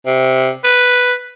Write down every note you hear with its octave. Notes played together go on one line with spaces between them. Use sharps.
C3
B4